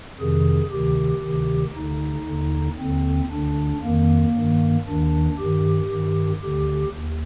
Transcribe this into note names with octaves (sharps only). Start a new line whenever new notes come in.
F2 C3 D#3 G#4
D2 C3 D#3 G4
D2 C3 D#3
D2 D3 D#4
D#2 D3
D#2 D3 C4
D2 D3 D4
F2 D#3 A#3
G2 D#3
D#2 D#3 D4
G2 D#3 G4
G2 D#3
D2 D3 G4
D#2